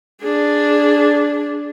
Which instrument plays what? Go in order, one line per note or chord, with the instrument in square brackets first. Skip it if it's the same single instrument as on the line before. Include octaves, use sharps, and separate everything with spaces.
[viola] D4 G#4